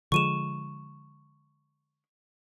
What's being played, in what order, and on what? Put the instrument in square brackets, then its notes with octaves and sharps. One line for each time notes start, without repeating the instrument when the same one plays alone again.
[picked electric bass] D3 F3 G#3 [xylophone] C#6 D#7 E7